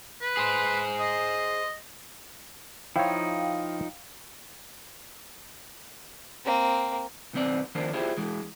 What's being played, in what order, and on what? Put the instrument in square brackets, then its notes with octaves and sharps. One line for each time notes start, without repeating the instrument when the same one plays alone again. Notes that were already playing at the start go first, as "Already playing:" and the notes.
[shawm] B4
[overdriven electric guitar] G#4 C5
[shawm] D#5
[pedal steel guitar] F3 D#4 [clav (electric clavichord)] E4 C5 C#5 [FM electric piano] F5 G5
[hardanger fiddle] A#3 C4
[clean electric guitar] B1 D#3 B3 C4 D5
D#3 F3 A#3 D4 C5
E4 F4 G4 G#4 C5
E3 G#3